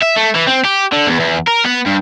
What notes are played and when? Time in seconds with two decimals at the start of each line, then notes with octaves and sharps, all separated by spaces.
0.03 E5
0.17 A3
0.36 E3
0.48 C4
0.65 G4
0.92 D3
1.07 E2
1.19 E2
1.48 A#4
1.65 B3
1.86 G2